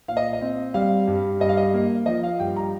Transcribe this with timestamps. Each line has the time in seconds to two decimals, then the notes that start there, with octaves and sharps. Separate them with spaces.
0.08 A#2 F5
0.17 D#5
0.33 D#5
0.41 C4
0.74 G3 F5
1.08 G2
1.40 G2 D#5
1.49 F5
1.57 D#5
1.74 A#3
2.06 F3 D#5
2.23 F5
2.40 G2 G5
2.56 A#5